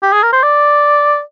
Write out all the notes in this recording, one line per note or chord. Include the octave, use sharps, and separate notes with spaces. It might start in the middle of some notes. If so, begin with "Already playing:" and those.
G4
G#4
A#4
C5
D5